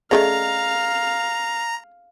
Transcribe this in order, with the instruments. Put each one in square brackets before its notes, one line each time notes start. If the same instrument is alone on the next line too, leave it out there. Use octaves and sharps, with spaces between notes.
[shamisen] C#3 F3 A3 [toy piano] G#4 D5 D#5 [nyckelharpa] F5 [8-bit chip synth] A#5